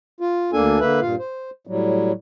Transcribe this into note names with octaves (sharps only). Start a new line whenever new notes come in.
F4
D2 A#3 D4 A4 G#5
D3 A#3 B4 E5
G2 A#2 F4 F5
C5
A2 F#3 G3